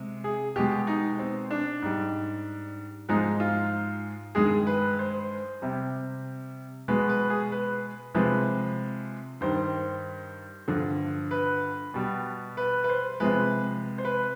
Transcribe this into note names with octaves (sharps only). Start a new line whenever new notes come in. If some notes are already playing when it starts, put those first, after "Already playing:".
Already playing: C3 G#3
G#4
B2 G#3 G4
D#4
C4
D4
G#2 G3
G#2 F3 G#3 D#4
F4
G2 D#3 G#3 G#4
B4
C5
C3 G3
B2 G#3 B4
B4
G#4
B4
C3 F3 G#3 B4
G2 D#3 G3 C5
G2 D3 F3
B4
B2 G3
B4
B4
C5
C3 F3 G#3 B4
C5
B4